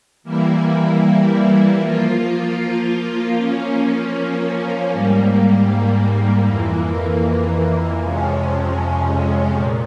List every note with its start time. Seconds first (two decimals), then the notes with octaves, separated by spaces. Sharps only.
0.23 E3 G3 A#3 E4
1.79 F3 A#3 F4
3.34 F3 A#3 C#4
4.90 G#2 G3 A#3
6.45 F2 E3 A#3
8.00 F2 C3 F3 G#3 C#4
9.56 A#2